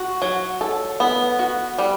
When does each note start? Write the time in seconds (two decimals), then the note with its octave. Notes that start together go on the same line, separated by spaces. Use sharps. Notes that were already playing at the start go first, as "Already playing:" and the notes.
Already playing: F#4
0.22 F#3
0.61 A4
1.00 B3
1.39 F#4
1.78 G3